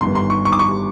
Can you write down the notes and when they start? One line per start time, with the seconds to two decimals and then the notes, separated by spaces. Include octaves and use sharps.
0.01 G1 G2 D#3 C6
0.15 C6
0.30 C#6
0.45 C#6
0.52 D6
0.59 C#6